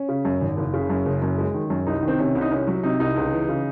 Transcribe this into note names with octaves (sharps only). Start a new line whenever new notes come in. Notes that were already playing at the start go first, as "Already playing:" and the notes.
Already playing: C#4
C#3
F#2
G#1
F#1
C#3
F#2
F#1
F#2
G#3
D#3
F#2
C2 D#4
D#3
C4
C3 C#4
C2
D#4
C2 C#4
F#3
C3 D#4
C2 D#4
C#2
E3
C#3